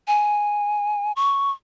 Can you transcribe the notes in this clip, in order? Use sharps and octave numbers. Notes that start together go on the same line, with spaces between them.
G#5
C#6